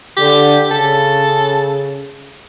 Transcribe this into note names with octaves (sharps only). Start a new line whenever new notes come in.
D3 G4
C#3 A4